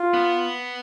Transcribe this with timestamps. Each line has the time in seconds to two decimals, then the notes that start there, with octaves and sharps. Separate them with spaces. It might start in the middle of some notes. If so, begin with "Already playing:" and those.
Already playing: F4
0.14 B3